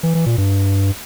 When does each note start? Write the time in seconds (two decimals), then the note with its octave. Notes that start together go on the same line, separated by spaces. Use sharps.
0.03 E3
0.15 E3
0.26 A#2
0.38 G2